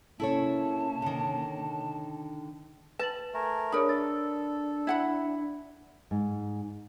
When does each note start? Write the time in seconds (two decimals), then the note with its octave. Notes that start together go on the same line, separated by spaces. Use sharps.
0.20 C3 A#3 C#4 E4 A4 C#5 A5
1.02 D3 D#3
2.99 B4 A5 A6 F#7
3.34 A3 A#4 G#5
3.72 D4 G#4 A#4 C#5 B5 D#6
3.89 A4 A6
4.87 E4 F#5 B5
6.11 G#2